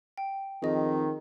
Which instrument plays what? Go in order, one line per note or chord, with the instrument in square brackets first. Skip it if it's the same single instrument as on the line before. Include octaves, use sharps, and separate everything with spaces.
[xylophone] G5
[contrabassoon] F2 [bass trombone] D#3 [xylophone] G#4 D#5